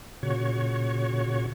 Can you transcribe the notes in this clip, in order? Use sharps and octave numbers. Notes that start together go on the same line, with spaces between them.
A#2 C#3 F#4 C#5